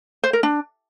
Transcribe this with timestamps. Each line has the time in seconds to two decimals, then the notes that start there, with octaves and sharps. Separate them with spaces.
0.24 C5
0.33 A#4
0.43 D4